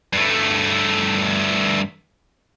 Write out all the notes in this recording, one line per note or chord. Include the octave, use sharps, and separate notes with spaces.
G2 A3